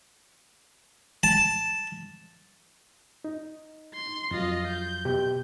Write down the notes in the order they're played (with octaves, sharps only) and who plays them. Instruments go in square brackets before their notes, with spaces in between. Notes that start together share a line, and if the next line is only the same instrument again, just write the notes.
[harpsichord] A5
[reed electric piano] D#4
[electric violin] C6
[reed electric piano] F2 F#3 [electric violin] F4 D#5
[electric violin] G6
[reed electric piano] B2 G4